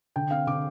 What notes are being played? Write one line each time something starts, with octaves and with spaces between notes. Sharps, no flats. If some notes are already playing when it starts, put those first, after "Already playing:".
D3 G5
C4 F5
D3 D6